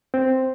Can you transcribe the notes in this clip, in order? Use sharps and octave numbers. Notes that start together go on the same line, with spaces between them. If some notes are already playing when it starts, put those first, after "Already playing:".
C4